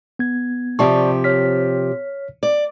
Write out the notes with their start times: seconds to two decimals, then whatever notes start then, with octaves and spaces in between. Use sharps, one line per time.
0.19 B3 G#6
0.79 C3 F3 G4 D5 A5 C#6
1.24 C#5 F6 B6
2.43 D5